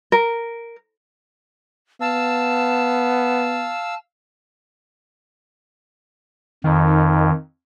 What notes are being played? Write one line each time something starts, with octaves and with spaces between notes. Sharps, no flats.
A#4
B3 F5 A5 E6
F2 D#3